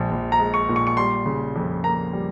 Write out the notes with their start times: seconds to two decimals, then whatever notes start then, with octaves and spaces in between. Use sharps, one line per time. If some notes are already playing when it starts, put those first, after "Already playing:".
Already playing: A#1 A#2 G#3
0.11 A#1
0.32 A#5
0.39 G#3
0.54 C#6
0.69 A#2
0.76 C#6
0.87 C#6
0.97 G3 C6
1.26 C#3
1.56 F2
1.84 A#3 A#5
2.13 G3